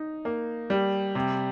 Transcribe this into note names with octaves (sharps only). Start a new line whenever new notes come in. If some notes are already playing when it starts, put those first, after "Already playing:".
Already playing: D#4
A#3
G3
C3